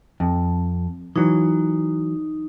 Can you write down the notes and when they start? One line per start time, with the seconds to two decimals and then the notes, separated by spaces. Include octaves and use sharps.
0.20 F2
1.16 E3 F#3 D#4